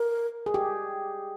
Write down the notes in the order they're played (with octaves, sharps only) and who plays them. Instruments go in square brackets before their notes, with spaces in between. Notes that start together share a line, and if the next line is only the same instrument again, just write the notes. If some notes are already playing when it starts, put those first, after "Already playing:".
Already playing: [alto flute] A#4
[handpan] G#4
G4